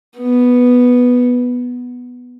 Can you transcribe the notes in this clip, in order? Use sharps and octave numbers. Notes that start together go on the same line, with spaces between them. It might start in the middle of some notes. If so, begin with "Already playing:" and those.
B3